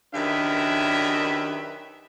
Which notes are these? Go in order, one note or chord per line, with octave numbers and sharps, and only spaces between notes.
F#2 D#3 D4 G4 B4 E5